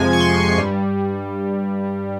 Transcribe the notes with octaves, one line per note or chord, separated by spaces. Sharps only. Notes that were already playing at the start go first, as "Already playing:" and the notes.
Already playing: F2 C3 F3 G#3 G#5
C#6
C6
G2 G3